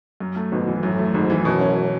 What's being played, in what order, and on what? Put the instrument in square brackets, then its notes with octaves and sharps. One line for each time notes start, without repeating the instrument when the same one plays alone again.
[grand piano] F#2
A3
[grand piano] G#1 [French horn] B2
[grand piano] E3
[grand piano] F#2 [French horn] A2
[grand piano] A3
[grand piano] G#1 [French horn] G#2
[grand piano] E3
[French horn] F#2 [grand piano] B2
[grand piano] C#4